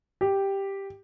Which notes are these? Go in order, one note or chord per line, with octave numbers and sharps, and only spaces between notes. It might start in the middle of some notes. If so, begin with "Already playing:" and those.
G4